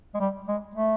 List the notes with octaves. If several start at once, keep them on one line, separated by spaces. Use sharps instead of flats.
G#3
G3
G#3
A3